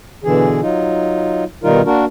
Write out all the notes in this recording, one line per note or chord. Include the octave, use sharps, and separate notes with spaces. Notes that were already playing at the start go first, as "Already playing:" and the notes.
B2 D3 E3 G#4
F#3 D#4 F4
B2 D#3 G3 D#4 F4 A#4
A#3 D4 F#4 A#4